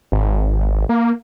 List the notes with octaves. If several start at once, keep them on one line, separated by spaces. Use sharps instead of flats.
G#1
A#3